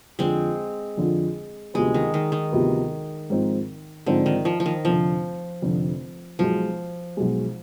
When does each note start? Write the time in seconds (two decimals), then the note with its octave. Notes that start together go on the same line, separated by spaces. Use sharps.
0.19 F2 D3 F3 G#3 C4
0.97 F2 D3 F3
1.74 D2 C3 F3 G#3 B3
1.94 D#3
2.14 D#3
2.32 D#3
2.52 D2 C3 F3 B3
3.30 G#2 F3 C4 D#4
4.06 G#2 D3 F3 C4 D#4
4.26 D#3
4.45 F3
4.60 F3
4.66 D#3
4.85 F1 F2 D3 F3
5.62 F1 F2 D3
6.39 B1 B2 F3 G#3
7.17 B1 B2 G#3